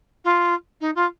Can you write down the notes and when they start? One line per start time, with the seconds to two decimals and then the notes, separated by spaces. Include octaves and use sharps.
0.24 F4
0.81 D#4
0.95 F4